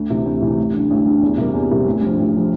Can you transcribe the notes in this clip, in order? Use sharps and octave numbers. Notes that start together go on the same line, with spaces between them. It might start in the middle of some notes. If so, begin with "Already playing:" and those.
Already playing: D2
C3 E3
D2
C3 E3
A1
G2 D3
A1
G2 D3
E2
C3 G3 A#3
E2
C3 G3 A#3
A1
G2
F3
A1
F3